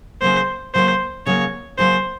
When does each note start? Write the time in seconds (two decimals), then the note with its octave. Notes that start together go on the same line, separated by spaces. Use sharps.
0.22 C#3 F#3 A#3 C5
0.74 C#3 F#3 A#3 C5
1.26 C#3 F#3 A#3 C#5
1.79 C#3 F#3 A#3 C5